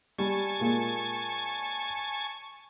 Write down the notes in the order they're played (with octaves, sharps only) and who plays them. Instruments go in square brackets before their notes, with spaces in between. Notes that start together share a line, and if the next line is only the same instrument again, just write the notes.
[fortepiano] G3 [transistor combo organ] G#5 A5 C#6
[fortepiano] A#2 G#3